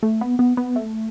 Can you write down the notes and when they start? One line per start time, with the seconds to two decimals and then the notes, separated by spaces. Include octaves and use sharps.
0.03 A3
0.21 B3
0.39 B3
0.57 B3
0.76 A3